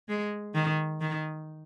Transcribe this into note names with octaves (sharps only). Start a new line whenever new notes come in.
G#3
D#3
D#3